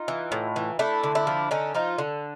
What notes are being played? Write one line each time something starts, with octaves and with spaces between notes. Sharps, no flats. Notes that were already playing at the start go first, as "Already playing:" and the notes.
Already playing: D#4 F4
E3
A2
E3
A3 D4 E4
D3
D4 E4
F3
D3 C#4 D#4
F3 D#4 F4
D3